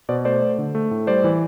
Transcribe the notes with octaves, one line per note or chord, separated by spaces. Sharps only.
B2 C5 D5
A3 C5 D5
A3
D3
A3
A2
G3 C5 D5
E3